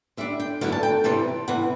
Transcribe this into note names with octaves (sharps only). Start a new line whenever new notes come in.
D3 G3 D4 E5
G5
F#2 D3 F#3 B3 E4 F#5
A5
G5
C3 E3 G3 A5
E2 C3 E3 F#5